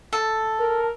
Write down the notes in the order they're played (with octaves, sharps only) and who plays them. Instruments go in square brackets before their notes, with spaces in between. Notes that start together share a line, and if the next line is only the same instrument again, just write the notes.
[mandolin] A4
[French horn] A#4